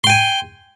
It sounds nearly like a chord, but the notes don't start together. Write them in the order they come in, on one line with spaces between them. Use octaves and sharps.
C6 G5 G#5